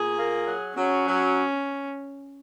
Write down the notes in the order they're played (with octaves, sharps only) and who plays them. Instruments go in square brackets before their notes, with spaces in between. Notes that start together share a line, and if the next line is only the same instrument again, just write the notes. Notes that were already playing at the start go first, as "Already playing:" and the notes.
Already playing: [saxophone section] A#2 [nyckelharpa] G#4
[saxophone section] A#3
F#3
[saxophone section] F#3 [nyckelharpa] C#4
[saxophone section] F#3